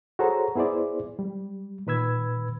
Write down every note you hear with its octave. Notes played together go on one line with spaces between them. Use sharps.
F#4 G#4 A4 C5 C#5 A#5
B3 E4 G#4 C5 D5
G3
A#2 D#3 B4 B5 E6 G#6